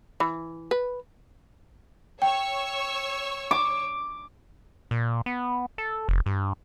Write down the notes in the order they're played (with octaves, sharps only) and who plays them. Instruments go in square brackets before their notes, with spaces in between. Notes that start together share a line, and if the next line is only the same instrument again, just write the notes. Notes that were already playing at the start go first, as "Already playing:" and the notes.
[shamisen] E3
B4
[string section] C#5 C#6 E6 [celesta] G5
[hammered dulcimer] D6
[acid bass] A#2
B3
A4
F1
G2